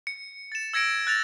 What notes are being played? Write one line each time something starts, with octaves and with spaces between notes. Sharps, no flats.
C#7
A6 E7
E6 G#6 A#6 C#7 D7
F#6 A6 F7